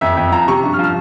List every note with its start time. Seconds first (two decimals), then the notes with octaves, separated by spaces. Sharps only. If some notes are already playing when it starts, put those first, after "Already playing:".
0.01 F2 E5
0.17 F2
0.32 F3 A#5
0.48 C3 C#6
0.64 G2
0.73 F6
0.79 F3
0.84 F6